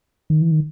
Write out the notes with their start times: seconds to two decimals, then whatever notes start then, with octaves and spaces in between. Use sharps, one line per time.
0.30 D#3
0.42 E3
0.51 D#3